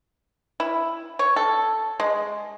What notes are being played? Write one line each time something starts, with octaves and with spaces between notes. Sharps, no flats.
E4
C#5
A4
G#3